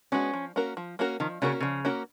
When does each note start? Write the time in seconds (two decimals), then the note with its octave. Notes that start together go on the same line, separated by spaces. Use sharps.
0.12 G#3 B3 C#4 F#4
0.34 F3
0.56 A#3 C#4 F#4 A#4
0.77 F3
0.99 A#3 C#4 F#4 A#4
1.20 D#3 F3
1.42 C#3 A#3 C#4 F#4 A#4
1.60 C#3 F3
1.85 A#3 C#4 F#4 A#4